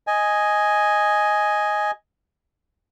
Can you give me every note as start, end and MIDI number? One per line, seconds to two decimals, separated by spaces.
0.07 1.91 75
0.07 1.91 80